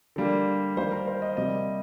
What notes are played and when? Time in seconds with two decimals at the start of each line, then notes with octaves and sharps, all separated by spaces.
0.16 D3 G3 A#3
0.77 D#3 G3 A#3 C5
0.92 A#4
1.07 C5
1.22 D#5
1.37 C3 G3 A#3 D#5